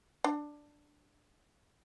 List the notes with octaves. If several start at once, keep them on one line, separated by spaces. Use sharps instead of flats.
D4